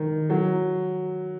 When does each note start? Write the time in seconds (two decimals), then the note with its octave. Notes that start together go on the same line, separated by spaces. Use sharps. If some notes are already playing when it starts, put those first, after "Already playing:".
Already playing: D#3
0.30 F#3